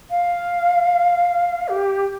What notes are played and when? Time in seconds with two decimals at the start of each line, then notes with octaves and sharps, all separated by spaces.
0.10 F5
1.68 G4